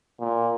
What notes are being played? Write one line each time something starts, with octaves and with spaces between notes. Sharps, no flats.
A#2